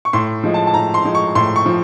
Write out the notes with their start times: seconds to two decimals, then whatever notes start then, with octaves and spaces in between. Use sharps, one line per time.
0.05 C#6
0.13 A2 C6
0.43 F3 G#3
0.54 A5
0.67 A5
0.74 A2 A#5
0.94 C6
1.05 F3 G#3
1.15 C#6
1.35 A2 C6
1.56 C#6
1.66 F3